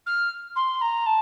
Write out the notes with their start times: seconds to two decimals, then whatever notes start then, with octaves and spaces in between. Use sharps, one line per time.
0.06 F6
0.55 C6
0.81 A#5
1.06 A5